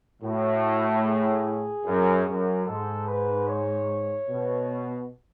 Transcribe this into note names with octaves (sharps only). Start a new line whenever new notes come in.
A2 F#4
G#4
F#2
F#2
G#2 A4
B4
C#5
B2